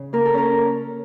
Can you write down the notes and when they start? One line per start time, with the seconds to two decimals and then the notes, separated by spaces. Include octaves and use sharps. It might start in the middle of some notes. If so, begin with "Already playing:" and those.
Already playing: C#3 C#4
0.13 A#3 A#4
0.25 A4
0.34 C#4 A#4